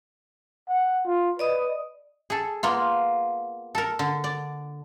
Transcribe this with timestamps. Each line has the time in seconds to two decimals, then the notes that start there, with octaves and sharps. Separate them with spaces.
0.69 F#5
1.05 F4
1.39 B4 D5 D#5 D#6
2.30 G#4 A4
2.63 A#3 B3 F4
3.75 A4 A#4
3.99 D3
4.24 D5